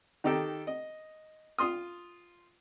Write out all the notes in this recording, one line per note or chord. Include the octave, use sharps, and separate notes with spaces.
D#3 D#4 G4 A4
D#5
F4 C6 D#6